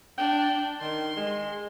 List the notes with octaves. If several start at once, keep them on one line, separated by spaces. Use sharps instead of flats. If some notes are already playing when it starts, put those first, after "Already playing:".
D4 G5
D#3 C6
G#3